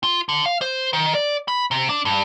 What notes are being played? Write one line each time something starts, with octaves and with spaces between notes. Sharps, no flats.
F4
D3
F5
C5
D#3
D5
B5
C3
D4
G2